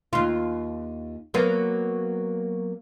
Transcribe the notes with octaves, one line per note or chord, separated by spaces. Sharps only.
D#2 F4
F#3 A#3 B3